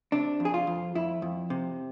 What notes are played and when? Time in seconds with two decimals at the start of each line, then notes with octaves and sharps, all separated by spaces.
0.12 C3 D4
0.40 F2
0.45 G#4
0.54 F4
0.67 F2
0.95 F2 E4
1.22 F2
1.50 C3